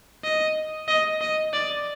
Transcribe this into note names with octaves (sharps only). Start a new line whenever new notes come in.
D#5
D#5
D#5
D5